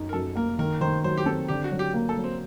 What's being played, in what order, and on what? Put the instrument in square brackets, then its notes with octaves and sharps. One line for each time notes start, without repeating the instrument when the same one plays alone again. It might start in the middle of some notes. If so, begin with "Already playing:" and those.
Already playing: [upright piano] F#2 D#4
[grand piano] A#4
[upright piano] F#2 [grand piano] A4
[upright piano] A#3 [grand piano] A#4
[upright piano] D#3 [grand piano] A#4
[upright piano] D#3 [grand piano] C5
[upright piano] F#3 [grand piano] C5
[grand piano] G4
[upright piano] C4 [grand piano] A4
[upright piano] D3 [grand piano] G4
[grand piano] F#4
[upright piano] F#3
[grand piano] G4
[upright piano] A#3
[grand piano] A4
[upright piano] F#3
[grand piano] C4